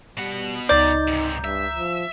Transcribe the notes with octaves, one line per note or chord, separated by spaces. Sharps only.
B2 G3 F#5
C#2 D#4 D5 A#5 G6
G#2 C3
G2 E5
F3